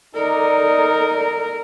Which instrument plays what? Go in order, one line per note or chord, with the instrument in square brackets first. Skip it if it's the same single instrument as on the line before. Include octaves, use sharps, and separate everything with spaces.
[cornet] D#4 [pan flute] A4 [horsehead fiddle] A#4 [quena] D5